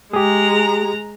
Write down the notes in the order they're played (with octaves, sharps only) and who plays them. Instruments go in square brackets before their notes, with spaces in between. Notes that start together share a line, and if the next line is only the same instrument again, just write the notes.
[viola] G#3 A#5 [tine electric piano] G4 G#4